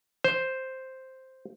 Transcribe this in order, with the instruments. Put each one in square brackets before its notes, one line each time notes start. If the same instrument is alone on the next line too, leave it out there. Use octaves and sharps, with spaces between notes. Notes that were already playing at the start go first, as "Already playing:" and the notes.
[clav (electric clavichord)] C5